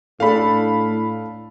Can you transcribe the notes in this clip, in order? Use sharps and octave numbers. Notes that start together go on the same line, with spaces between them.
A2 A3 D4 A4 F5 B5